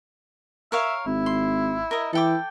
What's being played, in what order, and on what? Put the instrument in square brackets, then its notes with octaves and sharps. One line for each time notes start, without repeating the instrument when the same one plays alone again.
[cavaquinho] A#4 C#5 F5 [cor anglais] E5
[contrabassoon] G#1 [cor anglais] E4
[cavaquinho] C6
A#4 D#5
[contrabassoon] E3 [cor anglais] E4 [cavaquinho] A4 G5 D6